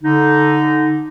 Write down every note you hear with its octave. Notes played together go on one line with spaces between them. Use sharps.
D3 D#4